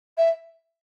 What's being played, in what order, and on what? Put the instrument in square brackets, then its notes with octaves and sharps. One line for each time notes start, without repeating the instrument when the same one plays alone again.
[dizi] E5